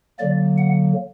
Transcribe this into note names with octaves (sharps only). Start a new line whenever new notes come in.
D3 F#3 A#3 D5
F#5